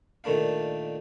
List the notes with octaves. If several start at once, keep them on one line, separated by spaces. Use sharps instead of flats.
A#2 D#3 A3 D4 F5